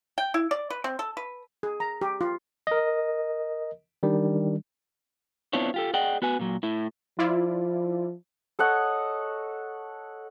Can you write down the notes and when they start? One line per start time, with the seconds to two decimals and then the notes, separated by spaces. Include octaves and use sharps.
0.18 G5
0.34 E4
0.51 D5
0.70 B4
0.84 C4
0.99 A4
1.17 B4
1.63 G#4
1.80 A#5
2.01 G4
2.21 F4
2.67 A#4 D#5
4.03 D#3 G3 D4
5.53 B3 C4 D4 E4 F4 C#5
5.74 F4 G4 A4
5.94 G#4 D5 D#5 F#5 G5
6.22 B3 F#4 B4 G#5
6.39 A#2 F#3
6.63 A2 E4
7.19 F3 E4 F4 D5
8.59 A4 C#5 D#5 F#5